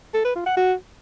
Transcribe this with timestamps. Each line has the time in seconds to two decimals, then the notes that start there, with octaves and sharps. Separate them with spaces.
0.14 A4
0.25 B4
0.35 F4
0.46 F#5
0.57 F#4